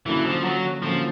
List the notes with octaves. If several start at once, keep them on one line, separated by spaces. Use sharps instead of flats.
D3 E3 F#3 A#3 C#4
F3
F#3
D3 F3 F#3 A#3 C#4